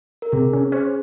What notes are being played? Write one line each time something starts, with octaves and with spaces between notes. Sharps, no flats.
A#4
C3 G#4
C#4
C#4 G#4 C5